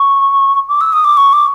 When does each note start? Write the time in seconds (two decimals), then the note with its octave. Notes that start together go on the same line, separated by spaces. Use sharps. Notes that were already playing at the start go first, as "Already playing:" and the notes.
Already playing: C#6
0.69 D6
0.81 E6
0.93 D#6
1.04 D6
1.17 C#6
1.33 D6